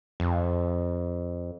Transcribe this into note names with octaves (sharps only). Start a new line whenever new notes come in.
F2